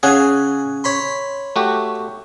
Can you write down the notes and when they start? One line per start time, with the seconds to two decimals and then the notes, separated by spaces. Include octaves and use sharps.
0.03 C#3 C#4 G#4 F#5 G#5
0.84 C#5 B5 C6
1.56 A3 F#4 G4